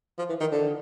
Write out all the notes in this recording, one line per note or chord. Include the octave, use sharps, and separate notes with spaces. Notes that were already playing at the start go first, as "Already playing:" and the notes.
F3
E3
D#3
D3